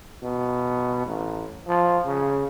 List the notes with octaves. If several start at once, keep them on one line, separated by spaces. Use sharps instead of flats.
B2
A1
F3
C#3